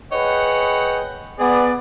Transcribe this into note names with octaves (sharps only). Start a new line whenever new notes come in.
G#4 B4 C#5 D#5 F#5 G5
B3 G#4 D5